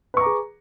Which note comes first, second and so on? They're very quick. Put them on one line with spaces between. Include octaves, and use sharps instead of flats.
B4 C#6 A#5 D6 G#4